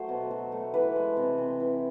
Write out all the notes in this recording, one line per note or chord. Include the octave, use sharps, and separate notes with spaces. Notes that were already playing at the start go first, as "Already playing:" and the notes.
Already playing: F#3 A3 C5
B2
F#3
A3
E3 B4
G#3
C3
C3
E3